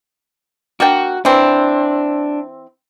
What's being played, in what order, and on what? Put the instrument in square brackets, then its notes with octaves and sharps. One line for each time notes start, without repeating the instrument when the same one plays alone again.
[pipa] A#3 D4 G5 [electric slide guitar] F#4
[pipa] E3 C4 [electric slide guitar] D4